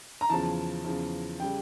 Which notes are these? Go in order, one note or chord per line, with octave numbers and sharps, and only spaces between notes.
A#5
E2 C#3 F3 A5
E2 C#3 F3
C#3 G3 G5